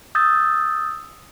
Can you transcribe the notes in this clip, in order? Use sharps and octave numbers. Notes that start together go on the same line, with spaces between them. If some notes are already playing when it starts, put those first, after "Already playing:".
D#6 E6 G6 A6